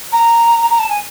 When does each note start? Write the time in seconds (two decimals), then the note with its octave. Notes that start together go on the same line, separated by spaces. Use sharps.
0.12 A#5
0.70 A#5
0.79 A5
0.89 G#5